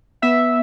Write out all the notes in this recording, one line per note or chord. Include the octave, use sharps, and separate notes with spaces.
B3 E5